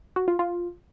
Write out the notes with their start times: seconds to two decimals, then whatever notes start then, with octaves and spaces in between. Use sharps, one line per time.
0.16 F#4
0.28 F4
0.39 F4